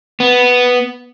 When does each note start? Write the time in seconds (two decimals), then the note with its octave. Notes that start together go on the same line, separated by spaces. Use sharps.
0.20 B3